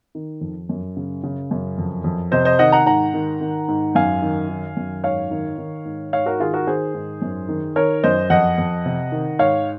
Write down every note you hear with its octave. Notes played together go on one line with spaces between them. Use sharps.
D#3
F2
F#2
C#3
C#3
F#2
F2
F2
C3 C5 D#5
C5 D#5
D#3 D#5 F#5
F#5 A#5
G#2 F#5 A#5
D#3
D#3
G#2
F#2 F5 G#5
D#3
D#3
F#2
G#2 C#5 F5
D#3
D#3
G#2
G#2 C#5 F5
F#4 A#4
D#3 F4 G#4
F#4 A#4
D#3 G#4 C5
G#2
F#2
D#3
D#3 A#4 C#5
F#2 C5 D#5
F2 D#5 F#5
F2
C3
D#3
G#2 C#5 F5